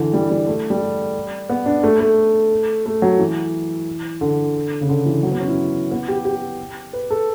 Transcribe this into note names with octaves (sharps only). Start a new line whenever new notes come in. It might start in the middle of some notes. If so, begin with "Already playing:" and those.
Already playing: D3 E3
G3
G3
A3
G3
B3
D4
A3
A3
A3
F#3
E3
D3
C#3
D3
E3
F#3
B3
C#4
E4
B3
G4
G4
B4
A4